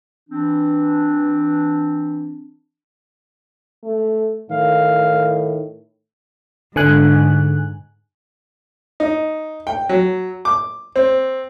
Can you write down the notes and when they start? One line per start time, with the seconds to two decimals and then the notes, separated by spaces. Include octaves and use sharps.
0.30 E3 C4 D4
3.84 A3
4.51 A2 D#3 F5
6.76 G#2 D3 G#5 F#6
9.00 D#4
9.67 G5
9.89 F#3
10.45 D6
10.96 C4